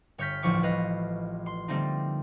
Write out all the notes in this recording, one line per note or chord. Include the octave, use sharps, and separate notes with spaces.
G1 C#5 F6 G6 B6
A1 D2 F3 C#6 D6
B4 D#5 F5
C6
D3 G3 A3 A#3 C4 D#4